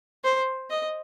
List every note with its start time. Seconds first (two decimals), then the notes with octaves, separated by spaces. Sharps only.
0.24 C5
0.70 D#5